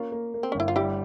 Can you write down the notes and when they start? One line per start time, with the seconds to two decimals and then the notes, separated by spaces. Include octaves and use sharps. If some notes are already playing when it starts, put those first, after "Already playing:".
Already playing: A#3 C#4 F4
0.12 A#3
0.34 A#3
0.43 C4
0.52 C#4
0.55 G1 E4
0.68 F4
0.76 G3 E4 G4